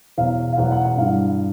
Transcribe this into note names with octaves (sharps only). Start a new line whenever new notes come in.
E2 B2 F#3 F5
F5
E2 B2 F#3 F#5
F#5
F#5
G2 E3 G3 F5